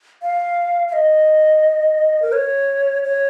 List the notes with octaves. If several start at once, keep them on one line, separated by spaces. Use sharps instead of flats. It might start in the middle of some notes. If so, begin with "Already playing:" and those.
F5
F5
D#5
A#4
C#5
C#5